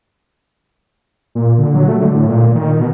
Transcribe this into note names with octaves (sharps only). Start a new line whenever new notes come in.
A#2
D3
F#3
A3
D3
A2
A#2
D#3
B2